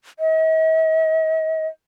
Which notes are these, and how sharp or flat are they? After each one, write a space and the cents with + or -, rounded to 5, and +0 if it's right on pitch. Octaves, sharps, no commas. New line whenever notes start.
D#5 +45